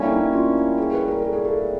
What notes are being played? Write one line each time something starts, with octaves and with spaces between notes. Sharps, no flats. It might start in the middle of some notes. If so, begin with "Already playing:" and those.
Already playing: G3 A#3 C#4 D4 E4
D#4
F4
G#4
B4
A#4
A4
G#4
A4